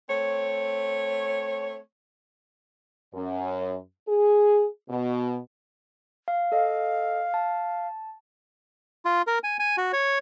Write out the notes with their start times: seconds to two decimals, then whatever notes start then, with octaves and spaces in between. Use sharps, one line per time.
0.10 A3 C4 C#5
3.14 F#2
4.08 G#4
4.89 B2
6.28 F5
6.52 A4 D#5 F5
7.34 A5
9.05 F4
9.27 A#4
9.44 G#5
9.59 G#5
9.77 F#4
9.93 C#5